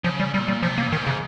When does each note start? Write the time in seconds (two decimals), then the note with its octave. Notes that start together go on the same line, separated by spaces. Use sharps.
0.04 C#3 F3
0.20 G3
0.34 A#2 G3
0.48 G3
0.62 C3 F3
0.78 A#3
0.87 G2
0.92 G#2 D#3
1.07 C#3